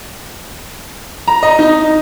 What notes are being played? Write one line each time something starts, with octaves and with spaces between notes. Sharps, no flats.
A#5
D#5
D#4